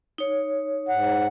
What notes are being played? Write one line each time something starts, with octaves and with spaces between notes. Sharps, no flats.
D#4 C#5
G#2 F#5